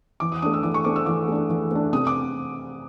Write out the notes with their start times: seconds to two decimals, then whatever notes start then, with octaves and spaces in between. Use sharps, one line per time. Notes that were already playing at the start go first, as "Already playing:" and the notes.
0.20 E3 D6
0.32 D#6
0.42 A3 D4 D#6
0.54 E6
0.63 E3 D6
0.74 C#6
0.85 A3 D4 D6
0.96 E6
1.06 E3 D6
1.28 A3 D4
1.50 E3
1.71 A3 D4
1.93 C3 D#6
2.07 D6